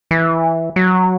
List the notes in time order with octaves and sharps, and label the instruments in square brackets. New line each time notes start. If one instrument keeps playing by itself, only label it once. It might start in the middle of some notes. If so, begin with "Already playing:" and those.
[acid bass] E3
F#3